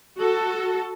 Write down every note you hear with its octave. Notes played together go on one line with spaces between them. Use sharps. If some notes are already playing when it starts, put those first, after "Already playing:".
F#4 A4